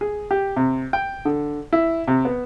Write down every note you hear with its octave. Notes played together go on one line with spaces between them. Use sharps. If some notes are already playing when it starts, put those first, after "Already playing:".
G#4
G4
C3
G5
D3
E4
C3
B3